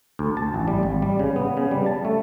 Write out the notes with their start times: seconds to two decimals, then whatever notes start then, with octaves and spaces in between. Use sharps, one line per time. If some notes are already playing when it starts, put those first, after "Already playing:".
0.19 D2
0.37 A5
0.54 A1
0.68 G3
0.83 G#1
1.02 G3
1.19 C#3
1.36 B3
1.57 C#3
1.71 G3
1.86 A5
2.05 A3